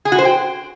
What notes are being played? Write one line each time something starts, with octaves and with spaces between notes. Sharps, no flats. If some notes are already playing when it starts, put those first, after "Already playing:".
G#4
F#4
C5
G5